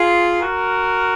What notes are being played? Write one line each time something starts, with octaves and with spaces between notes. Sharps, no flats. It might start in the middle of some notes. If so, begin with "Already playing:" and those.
Already playing: F4 G#4
F#4 A#4